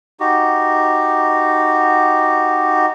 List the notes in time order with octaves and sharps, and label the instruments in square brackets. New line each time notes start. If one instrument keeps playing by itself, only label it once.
[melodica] D#4 F#4 G4